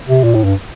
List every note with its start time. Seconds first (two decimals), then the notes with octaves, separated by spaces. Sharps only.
0.08 C3
0.24 A#2
0.34 A2
0.45 G2